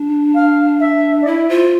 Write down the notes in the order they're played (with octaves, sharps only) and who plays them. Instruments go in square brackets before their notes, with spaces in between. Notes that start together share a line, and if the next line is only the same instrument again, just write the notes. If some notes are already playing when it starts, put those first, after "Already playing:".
Already playing: [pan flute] D4
[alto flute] F5
E5
D5
[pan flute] E4 [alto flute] E5
[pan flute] F4 [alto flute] C5